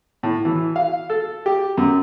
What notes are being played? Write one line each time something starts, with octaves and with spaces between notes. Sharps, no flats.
A2
E3
F5
A4
G4
F#2